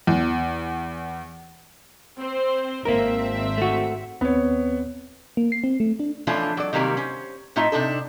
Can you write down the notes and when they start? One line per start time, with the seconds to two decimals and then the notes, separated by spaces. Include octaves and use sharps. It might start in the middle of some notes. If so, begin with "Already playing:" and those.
0.07 E2
2.19 C4 C5
2.85 G#1 A#3 C4 A#4 E5
3.58 A3 F#4
4.21 D#2 B3 C4 C#5
5.37 A#3
5.52 C7
5.64 C4
5.80 A3
6.00 D4
6.27 E3 F3 A3 C#4 D4 F4
6.57 F#3 D5
6.73 C3 D#3 F#3 G3 A3 A#3
6.97 C#4 C5
7.56 A2 A3 D#4 F4 D#5 E5
7.72 C3 D4 D#4 A4